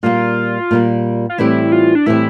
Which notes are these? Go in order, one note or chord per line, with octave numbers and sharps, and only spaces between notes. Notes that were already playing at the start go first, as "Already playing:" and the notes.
A#2 G3 A#3 F4
A#2 G3 A#3
F4
A2 E3 G3 C4 E4 G4
F4
D4
A2 E3 G3 C4 E4 G4